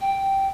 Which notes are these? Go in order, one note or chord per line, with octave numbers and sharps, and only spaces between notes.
G5